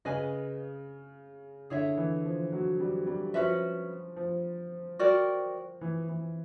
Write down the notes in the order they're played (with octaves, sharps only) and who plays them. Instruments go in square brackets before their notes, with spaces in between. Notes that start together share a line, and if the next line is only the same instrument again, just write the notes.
[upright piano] C#3 [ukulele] G#4 B4 D#5 G#5
[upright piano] D3 [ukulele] E4 G#4 C#5 E5
[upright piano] E3
F3
F#3
G3
G3
[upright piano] F3 [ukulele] C#4 F#4 B4 E5
[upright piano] F3
[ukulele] F#4 A#4 D5 G5
[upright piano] E3
E3